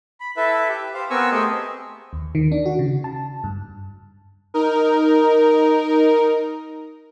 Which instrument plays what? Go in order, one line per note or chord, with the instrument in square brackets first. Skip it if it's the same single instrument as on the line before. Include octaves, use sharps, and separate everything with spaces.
[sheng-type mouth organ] B5
E4 A4 B4 E5
G4
G4 C5 F5
B3 C4 A#4 G#5 C#6 E6
A3 C4 G4 G#4 D#5
[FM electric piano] D#2
D#3
D4
F#4
C#3
A5
G2
[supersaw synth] D#4 A#4